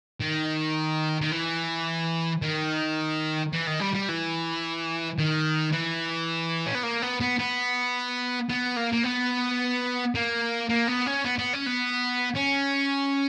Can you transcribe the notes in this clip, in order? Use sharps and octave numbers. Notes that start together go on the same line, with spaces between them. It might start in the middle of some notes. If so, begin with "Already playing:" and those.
D#3
D#3
E3
D#3
E3
D#3
G3
G3
E3
D#3
E3
C#4
B3
A#3
B3
B3
B3
B3
A#3
A#3
B3
A#3
A#3
B3
C#4
B3
B3
C#4
B3
C#4